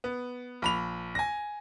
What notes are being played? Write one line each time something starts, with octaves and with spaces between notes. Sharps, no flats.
B3
A#1 B5 F7
G#5 A#6